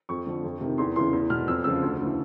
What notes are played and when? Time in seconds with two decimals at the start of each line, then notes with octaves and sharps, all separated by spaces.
0.09 F2 C#6
0.26 D3 F3
0.44 F2
0.61 C3 D#3
0.78 E2 C6
0.96 C#3 E3 C6
1.13 E2
1.30 B2 F6
1.48 F2 E6
1.64 C#3 F3 E6
1.82 D2
2.00 C#3 E3